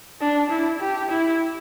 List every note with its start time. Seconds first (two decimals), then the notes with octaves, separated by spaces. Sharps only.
0.21 D4
0.50 E4
0.81 G4
1.10 E4